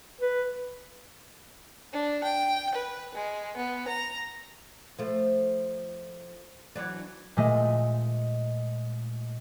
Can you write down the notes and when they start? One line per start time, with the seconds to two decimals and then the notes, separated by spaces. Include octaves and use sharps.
0.21 B4
1.93 D4
2.23 G5
2.74 B4
3.15 G#3
3.56 B3
3.88 A#5
4.99 F3 A3
6.75 E3 F#3 D4
7.37 A#2 G#3 A3 D#5